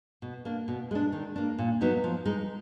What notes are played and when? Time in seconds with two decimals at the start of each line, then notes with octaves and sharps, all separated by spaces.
0.22 B2
0.45 A#3 D4
0.68 B2
0.91 G#3 D4
1.12 D#3
1.36 A#3 D4
1.58 A#2
1.81 F#3 B3 D#4
2.04 F3
2.25 G#3 D#4